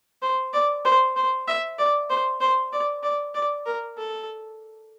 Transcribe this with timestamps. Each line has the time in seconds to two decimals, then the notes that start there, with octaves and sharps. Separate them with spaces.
0.22 C5
0.53 D5
0.85 C5
1.16 C5
1.47 E5
1.78 D5
2.09 C5
2.40 C5
2.72 D5
3.03 D5
3.34 D5
3.66 A#4
3.97 A4